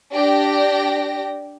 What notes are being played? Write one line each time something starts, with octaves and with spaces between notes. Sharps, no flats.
D4 G4 G5 A#6